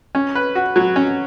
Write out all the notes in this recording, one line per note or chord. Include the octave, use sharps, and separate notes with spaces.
C#4
B4
F#4
F#3
C#4